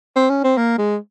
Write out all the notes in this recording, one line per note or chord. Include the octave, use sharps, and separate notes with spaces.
C4
C#4
C4
A#3
G#3